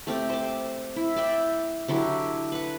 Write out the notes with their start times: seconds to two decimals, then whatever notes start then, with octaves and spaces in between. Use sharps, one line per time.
0.07 A3 C4 G4
0.30 C5 D6
0.96 E4
1.16 D5 E5 G5
1.88 D3 F#3 E4 G4
2.52 B4 F#5